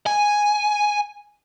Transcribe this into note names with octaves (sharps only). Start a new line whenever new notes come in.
G#5